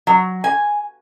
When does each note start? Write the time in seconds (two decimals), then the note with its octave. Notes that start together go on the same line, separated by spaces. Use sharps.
0.07 F#3
0.44 G#5